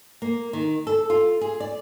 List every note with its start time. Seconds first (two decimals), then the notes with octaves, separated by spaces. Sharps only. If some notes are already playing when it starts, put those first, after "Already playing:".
0.22 A#3
0.53 D#3
0.87 A4
1.10 F4
1.41 G#4
1.60 D5